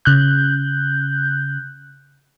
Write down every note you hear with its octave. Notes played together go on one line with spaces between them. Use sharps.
C#3 F#6 G6